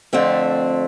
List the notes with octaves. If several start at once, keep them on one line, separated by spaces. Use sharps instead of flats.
F2 D3 A3 C4